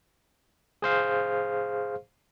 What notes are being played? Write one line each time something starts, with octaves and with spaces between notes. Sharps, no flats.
G#4 C5 F5